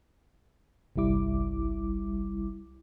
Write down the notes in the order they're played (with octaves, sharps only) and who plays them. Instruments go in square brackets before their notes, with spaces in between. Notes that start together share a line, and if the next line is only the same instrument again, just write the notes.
[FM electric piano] G1 C2 G3 E4 D6